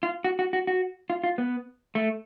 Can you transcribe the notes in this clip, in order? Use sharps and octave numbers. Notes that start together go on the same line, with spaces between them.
F4
F#4
F#4
F#4
F#4
F4
F4
B3
A3